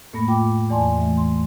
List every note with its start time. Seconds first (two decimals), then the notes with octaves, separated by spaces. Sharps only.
0.13 F2 A2 A3 A#3 B5 A#6
0.28 F4 G5 D6
0.69 E2 E3 D5 G#5 A5 C6
0.99 E3 A3
1.17 C6